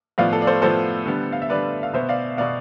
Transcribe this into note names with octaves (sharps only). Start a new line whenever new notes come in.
A2 F3 B3 D5 F5
A4
D5
A4 C5
A2 F3 B3 A4 C5
D3 G3 B3
F5
E5
D3 G3 B3 B4 D5
F5
B2 B3 C5 E5
D5 F5
B2 B3 D5 F5